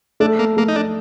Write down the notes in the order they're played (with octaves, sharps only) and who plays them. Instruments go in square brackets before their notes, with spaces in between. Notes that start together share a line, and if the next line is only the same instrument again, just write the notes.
[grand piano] A3 [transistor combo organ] D4
[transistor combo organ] A#3
[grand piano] A3 [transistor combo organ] A#3
[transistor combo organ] D#4
D4